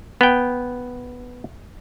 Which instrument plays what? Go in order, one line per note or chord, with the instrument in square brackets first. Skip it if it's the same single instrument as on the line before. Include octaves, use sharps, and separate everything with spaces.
[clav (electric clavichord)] B3 G5